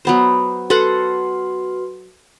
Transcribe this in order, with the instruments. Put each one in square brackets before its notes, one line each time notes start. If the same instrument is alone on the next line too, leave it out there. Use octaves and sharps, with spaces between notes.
[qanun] F#3 B3 C5
[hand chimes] F#4 B4 C6 [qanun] A4 F#5